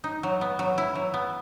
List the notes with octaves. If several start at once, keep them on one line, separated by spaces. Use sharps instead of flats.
D#4
F#3
B3
F#3
E4
F#3
B3